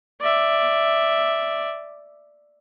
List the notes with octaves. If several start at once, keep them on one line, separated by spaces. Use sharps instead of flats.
D5 E5